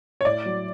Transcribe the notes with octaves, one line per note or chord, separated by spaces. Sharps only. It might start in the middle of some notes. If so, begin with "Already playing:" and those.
C#5
A2 D5
F#3